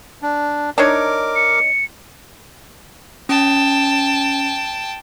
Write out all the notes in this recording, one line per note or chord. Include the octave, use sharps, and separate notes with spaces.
D4
D4 D#4 A#4 C#5 D6
C#7
C#4 G5 A5